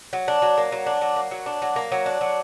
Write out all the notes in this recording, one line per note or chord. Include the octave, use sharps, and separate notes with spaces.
F#3
D4
F#3
A#3
F#3
D4
F#3
A#3
F#3
D4
F#3
A#3
F#3
D4
F#3